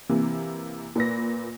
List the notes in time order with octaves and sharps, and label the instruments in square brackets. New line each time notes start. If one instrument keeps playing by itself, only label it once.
[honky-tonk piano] C3 E3 A#3
A#2 B4 A#6